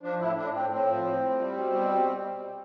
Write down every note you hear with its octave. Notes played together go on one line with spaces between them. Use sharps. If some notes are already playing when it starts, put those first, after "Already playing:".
F3 D4
A2 E4
A2 D4
A2 C4
A2 C4
F3
A2
A2
G3
B2
G3
B2